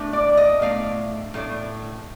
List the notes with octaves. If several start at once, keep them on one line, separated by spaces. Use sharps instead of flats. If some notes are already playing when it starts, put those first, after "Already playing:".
Already playing: A2 A3 D4
D5
D#5
A2 A3 D4 F5
A2 A3 D4